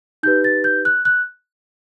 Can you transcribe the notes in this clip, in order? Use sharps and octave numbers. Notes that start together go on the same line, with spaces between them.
D#4 G4 B4 G6
A6
G6
F#6
F#6